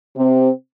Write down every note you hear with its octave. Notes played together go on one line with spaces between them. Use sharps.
C3 C4